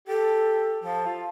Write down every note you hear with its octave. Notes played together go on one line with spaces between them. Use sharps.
G4 A4
F3 A5
F4